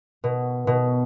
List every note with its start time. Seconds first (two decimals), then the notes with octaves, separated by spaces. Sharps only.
0.24 B2
0.67 B2